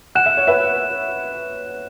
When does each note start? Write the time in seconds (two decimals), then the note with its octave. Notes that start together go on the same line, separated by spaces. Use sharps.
0.15 F#5 F#6 E7
0.26 E5
0.37 C#5
0.47 B4 E5